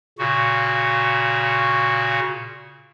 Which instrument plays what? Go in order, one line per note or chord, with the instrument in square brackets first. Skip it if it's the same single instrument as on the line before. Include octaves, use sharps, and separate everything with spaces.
[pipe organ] A#2 C#3 F#4